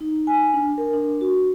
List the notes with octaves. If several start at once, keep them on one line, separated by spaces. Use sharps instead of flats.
D#4
G#5
D4
A#4
D4
F#4